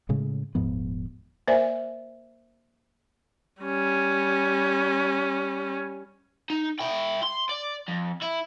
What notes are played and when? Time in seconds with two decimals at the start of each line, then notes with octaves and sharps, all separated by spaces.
0.09 A2 C#3 G#3
0.55 D#1 G#2 F3 B3
1.48 A#3 A#4 C5 D5 E5 G#5
3.62 G3 C#4
6.50 D#4
6.79 E4 G5
7.23 C6
7.49 D5
7.88 F2
8.22 E4